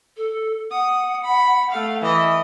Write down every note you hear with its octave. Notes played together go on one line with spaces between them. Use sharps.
A4
F#5 D#6
B5
A3 F5
E3 D#5